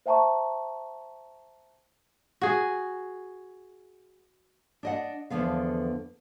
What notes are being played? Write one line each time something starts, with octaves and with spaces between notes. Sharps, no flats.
C5 E5 G5 A5 A#5 C#6
F#4 G#4
D4 D#5 F#5
E2 G2 D3 F3 B3 F5